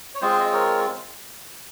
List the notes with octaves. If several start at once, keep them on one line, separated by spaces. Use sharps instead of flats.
C#5
G#3 C4 F4 G#4 C5
D#5
A#4 C#5